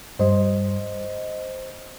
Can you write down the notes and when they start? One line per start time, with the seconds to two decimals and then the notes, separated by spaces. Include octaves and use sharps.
0.19 G2 G3 C5 D#5